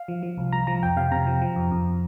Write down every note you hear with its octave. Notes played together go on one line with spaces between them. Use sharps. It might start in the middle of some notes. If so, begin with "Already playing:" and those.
Already playing: F5
F3
F3
C2
C2 A#5
F3 A#5
F2 G5
C3 F5
C3 A#5
F3
F3
F2
F2